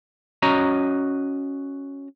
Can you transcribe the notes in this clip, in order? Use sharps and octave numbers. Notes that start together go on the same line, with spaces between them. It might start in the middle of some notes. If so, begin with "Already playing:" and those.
C#4 F#4 D#5 A#5